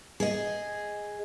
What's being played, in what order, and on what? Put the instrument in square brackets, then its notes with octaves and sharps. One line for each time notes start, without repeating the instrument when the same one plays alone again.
[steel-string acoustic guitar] G#4 D#5